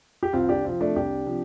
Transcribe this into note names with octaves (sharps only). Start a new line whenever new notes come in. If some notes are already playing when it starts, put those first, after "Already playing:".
G4
C2 C4 F4
D4 G4
C3 F3 C4 F4
A3 D4
C2 D4 G4
C3 F3